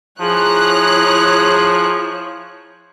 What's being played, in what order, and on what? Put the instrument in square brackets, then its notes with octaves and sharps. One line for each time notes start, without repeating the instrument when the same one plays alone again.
[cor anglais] F3 [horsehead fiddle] E4 C#5 [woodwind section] G#4 [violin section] A#5 F#6